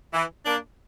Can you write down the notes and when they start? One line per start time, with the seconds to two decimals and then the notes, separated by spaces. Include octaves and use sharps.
0.14 E3
0.46 A#3 D4